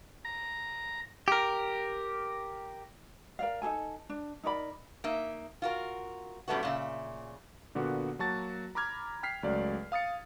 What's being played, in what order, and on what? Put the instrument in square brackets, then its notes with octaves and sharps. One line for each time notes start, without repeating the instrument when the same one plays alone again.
[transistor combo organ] A#5
[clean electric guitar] G4 A#4
[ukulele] A#4 D5 F5
D#4 G#4 A4 G#5
D4
D#4 A#4 D5 B5
[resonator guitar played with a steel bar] A#3 D#4 E5
F4 F#4 A#4
F#2 A2 G3 A3 B3 F#4
A#2 C#3 E5
[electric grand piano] A#2 D3 A#3 B3 F#4
F#3 A#3 F#4 A5 A6
A#5 B5 D6 F6 G#6
G5 F6 B6 C7
C#2 F#3 A3 D5
F5 D#6 A6 C#7